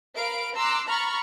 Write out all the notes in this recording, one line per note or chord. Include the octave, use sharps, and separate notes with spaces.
A#4 F5 B5 D7
A#5 C6 D6 E6 F#6
A#5 B5 C#6 F6 A6